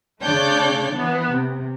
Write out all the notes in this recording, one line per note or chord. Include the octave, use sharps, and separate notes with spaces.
C#3 A3 D4 C#5 D5 G6
E3 B3
C3